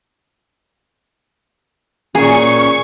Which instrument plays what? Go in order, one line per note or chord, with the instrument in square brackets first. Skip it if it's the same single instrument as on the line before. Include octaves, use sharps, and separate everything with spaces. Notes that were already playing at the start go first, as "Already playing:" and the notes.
[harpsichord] A#2 A#3 [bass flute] C#4 [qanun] G#4 [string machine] C#6